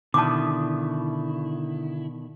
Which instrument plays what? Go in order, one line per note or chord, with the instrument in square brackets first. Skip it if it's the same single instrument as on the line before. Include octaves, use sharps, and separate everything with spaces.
[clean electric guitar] B2 D#3 D4 [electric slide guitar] D3 E4 [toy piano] A5 D6